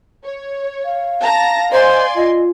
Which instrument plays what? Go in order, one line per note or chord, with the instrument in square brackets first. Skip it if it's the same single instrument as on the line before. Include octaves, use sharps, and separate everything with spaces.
[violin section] C#5
[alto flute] F5
[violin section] A5 A#5 A#6
[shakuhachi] C5 [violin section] D5 G#5 C6 [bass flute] D#5
[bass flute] F4 [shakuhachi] D#5